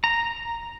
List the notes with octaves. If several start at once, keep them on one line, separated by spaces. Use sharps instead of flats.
A#5